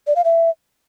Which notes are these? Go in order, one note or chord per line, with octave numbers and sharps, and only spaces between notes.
D5
F5
E5